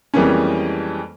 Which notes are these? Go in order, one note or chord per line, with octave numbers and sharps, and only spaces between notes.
F2 E3 G3 G#3 A#3 C#4